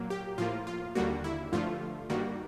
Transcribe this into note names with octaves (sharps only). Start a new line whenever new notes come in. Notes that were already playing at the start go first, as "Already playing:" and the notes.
Already playing: A#2 F#3 A#3
G4
A2 F3 A#3 F4
F4
D#2 D3 G3 A#3 F#4
E4
G2 D3 F3 A3 F4
G2 D#3 G3 A#3 F#4